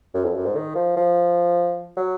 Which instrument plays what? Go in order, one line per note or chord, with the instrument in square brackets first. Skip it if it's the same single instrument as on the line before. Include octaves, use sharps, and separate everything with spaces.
[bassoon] F#2
F2
F#2
G#2
D#3
F3
F3
F#3